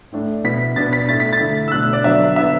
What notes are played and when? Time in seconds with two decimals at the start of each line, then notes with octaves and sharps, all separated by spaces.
0.12 A2 A3 D4
0.44 B2 B3 E4 B6
0.76 B2 B3 D4 A6
0.93 B6
1.08 A2 A3 D4 A6
1.20 B6
1.33 A6
1.40 D3 A3 E4
1.68 E6
1.72 B2 A3 D4 F#6
1.93 D5
2.04 D3 F#3 B3 D4 E5
2.36 D3 B3 E4 E5